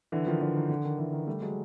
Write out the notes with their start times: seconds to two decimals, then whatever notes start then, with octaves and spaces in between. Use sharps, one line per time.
0.12 D3 E3
0.27 D#3 F3
0.41 D3 E3
0.55 D#3
0.69 D3
0.84 D#3
0.98 D3 E3
1.13 D#3
1.27 G3 A3
1.41 F#3 G#3